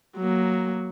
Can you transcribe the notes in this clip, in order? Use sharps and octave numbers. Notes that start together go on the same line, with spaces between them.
F#3 A#3